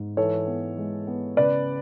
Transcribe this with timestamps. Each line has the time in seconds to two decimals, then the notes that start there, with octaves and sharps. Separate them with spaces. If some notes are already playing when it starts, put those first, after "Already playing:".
Already playing: G#2
0.17 E3 A4 C#5
0.47 B3
0.77 G#3
1.07 B3
1.37 C#3 B4 D5